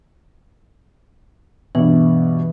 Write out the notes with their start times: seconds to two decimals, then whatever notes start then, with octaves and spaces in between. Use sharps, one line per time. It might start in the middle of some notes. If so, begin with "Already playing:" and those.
1.75 G2 B2 E3